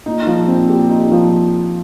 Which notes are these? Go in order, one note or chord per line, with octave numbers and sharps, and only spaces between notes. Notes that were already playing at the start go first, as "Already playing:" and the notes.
A#2 D#4
F3
C4
G4
D#4
F3